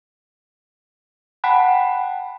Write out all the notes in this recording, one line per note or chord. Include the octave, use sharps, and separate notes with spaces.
F#5 G5 A5 B5 F#6